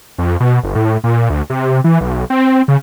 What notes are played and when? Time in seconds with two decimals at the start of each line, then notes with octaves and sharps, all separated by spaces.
0.18 F2
0.40 B2
0.63 G1
0.75 A2
1.04 A#2
1.30 D2
1.50 C3
1.84 E3
2.01 B1
2.30 C4
2.68 C#3